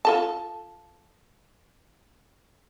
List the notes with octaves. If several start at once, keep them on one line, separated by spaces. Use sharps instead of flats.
F4 A4 A5